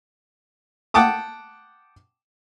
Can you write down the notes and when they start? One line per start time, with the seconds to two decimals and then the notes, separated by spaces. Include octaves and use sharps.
0.94 F#5 G5 A5 D6 D#6